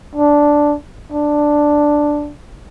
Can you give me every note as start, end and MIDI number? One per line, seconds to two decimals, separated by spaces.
0.15 0.76 62
1.12 2.33 62